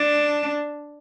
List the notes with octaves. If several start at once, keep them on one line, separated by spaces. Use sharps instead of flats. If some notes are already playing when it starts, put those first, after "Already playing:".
Already playing: D4